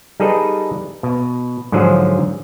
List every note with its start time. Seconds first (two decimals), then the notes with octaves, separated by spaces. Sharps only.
0.20 G3 D#4 G#4 A4 B4 D#5
1.03 B2
1.72 G#2 D3 F3 F#3 G#4 C5